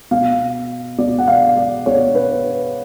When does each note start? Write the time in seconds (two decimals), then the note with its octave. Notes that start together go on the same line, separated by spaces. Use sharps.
0.11 B2 F5
0.98 B2 D5
1.18 F#5
1.28 F5
1.57 D5
1.86 B2 C#5
2.15 B4